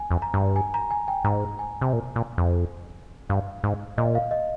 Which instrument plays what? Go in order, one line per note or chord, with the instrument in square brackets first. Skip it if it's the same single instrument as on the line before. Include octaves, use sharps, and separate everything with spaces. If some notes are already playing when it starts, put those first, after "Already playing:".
Already playing: [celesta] G#5
[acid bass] F2
[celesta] A#5
[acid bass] G2
[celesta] G#5
A#5
G#5
G5
[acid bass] G#2 [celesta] A#5
[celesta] G#5
[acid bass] C3
A#2
A#2
F2
[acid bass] G2 [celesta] F5
[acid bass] G#2
[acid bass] A#2 [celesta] D#5
[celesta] F5
D#5